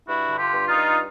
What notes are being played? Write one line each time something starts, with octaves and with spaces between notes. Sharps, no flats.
G2 E4 F#4
D3
F4 G4
G2
D#4 F4
G2